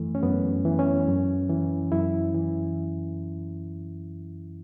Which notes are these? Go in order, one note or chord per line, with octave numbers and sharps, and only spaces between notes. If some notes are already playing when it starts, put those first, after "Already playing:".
Already playing: F#2 E3 A3
C#4
F#2 B3
E3
C#4
F#2
E3
F#2 E4
E3